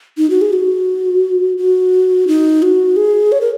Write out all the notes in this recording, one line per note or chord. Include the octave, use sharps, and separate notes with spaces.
D#4
F#4
G#4
F#4
F#4
D#4
F#4
G#4
C#5
A#4